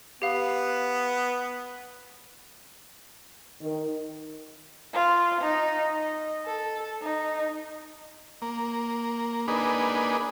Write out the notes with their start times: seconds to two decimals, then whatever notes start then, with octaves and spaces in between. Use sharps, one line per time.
0.22 B3 G4 F5
3.60 D#3
4.93 F4
5.41 D#4
5.95 D#5
6.46 A4
7.02 D#4
8.42 A#3
9.48 A#3 D4 D#4 G#4 B4